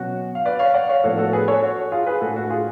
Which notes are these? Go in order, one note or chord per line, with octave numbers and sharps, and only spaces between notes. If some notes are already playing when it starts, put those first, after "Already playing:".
Already playing: B2 F#3 C#4 F#4
F5
B4 D5
C#5 F5
D5 F#5
C#5 F5
A2 F3 B3 D4 F#4 A4
F#4 A4
G#4 B4
A4 C#5
F#4
F4 G#4
G#4 B4
A2 G#3 D4 F#4 A4
F#4
F4 G#4